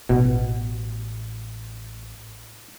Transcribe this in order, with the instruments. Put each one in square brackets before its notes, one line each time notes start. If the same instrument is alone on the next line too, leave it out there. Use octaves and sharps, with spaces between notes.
[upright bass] A1 [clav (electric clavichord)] B2